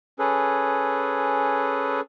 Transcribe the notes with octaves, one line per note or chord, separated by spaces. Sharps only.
C#4 G#4 A4 B4